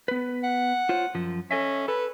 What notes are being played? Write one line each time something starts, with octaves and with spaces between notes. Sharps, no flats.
B3 B4
F#5
F4 C5 C#5
F#2 F3
C#4 A4 D#5 E5
A4 B4